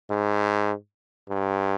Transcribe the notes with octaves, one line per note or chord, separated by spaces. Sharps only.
G#2
G2